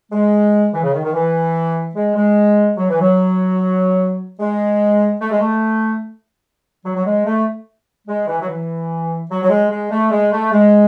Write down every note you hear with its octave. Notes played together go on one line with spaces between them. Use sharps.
G#3
E3
C#3
D#3
D#3
E3
G#3
G#3
F#3
E3
F#3
G#3
A3
G#3
A3
F#3
F#3
G#3
A3
G#3
E3
F#3
E3
F#3
F#3
G#3
G#3
A3
G#3
A3
G#3